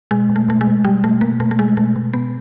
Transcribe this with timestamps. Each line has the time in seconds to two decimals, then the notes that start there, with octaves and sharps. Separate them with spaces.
0.11 B2 G#3
0.29 B2
0.36 A3
0.48 B2 A3
0.61 G#3
0.67 B2
0.85 B2 G3
1.04 B2 A3
1.21 B2 A#3
1.40 B2 A3
1.51 A3
1.59 B2 G#3
1.77 B2 A3
1.96 B2
2.13 B2 B3